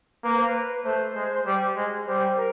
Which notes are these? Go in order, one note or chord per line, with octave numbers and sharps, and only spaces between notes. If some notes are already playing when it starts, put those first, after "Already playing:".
A#3 B4
C5
B4
A3 C5
G#3
G3
G#3
G3 C5
A#4